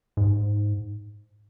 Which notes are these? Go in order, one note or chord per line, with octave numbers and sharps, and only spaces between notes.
G#2